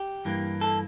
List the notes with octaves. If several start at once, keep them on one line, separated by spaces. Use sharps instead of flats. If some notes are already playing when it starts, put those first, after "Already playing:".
Already playing: G4
G2 E3 A#3
A4